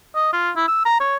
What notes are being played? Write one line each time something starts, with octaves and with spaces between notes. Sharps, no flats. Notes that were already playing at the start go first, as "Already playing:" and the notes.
D#5
F4
E4
E6
A#5
C#5